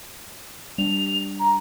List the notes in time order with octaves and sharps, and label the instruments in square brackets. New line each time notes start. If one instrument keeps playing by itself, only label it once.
[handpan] G3 D4 [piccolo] F7
[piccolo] A#5